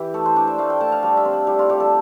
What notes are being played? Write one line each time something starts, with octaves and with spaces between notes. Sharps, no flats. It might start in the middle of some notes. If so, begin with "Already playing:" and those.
Already playing: E3 E4 G4
A3 A4
C5
D4 D5
E5
A3 F5
G5
A3 A5
F5
G3 F5
E5
C4
D5
G3 E4
F4
G3 G4
A4